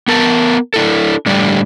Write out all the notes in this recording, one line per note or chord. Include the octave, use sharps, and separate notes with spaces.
B3 A#4 A5
D4 E4 A4
A2 D3 G3 D5